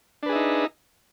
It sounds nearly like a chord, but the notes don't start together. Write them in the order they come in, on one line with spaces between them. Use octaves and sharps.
D4 B4 G#4 E5 D#4